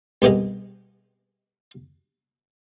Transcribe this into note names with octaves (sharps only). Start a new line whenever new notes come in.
C2 B2 G4 G#4 D#5